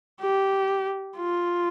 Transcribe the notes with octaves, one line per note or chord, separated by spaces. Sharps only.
G4
F4